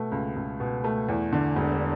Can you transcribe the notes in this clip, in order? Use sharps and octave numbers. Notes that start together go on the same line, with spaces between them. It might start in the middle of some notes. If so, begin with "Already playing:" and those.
Already playing: B2 A3
C#2
C#2
B2
A3
E2
D3
E1